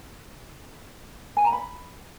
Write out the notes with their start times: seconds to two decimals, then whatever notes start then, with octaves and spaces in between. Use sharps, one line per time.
1.37 G#5
1.44 A#5
1.52 B5